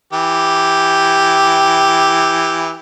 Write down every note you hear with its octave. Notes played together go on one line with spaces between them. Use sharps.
E3 G4